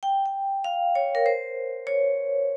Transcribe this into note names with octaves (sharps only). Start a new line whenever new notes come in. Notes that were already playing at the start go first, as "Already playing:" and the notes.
G5
G5
F5
C#5
A#4
C5
C#5